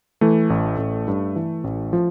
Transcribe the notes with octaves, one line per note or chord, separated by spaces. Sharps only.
E3 A3
A1
A1
G2
E3
A1
F3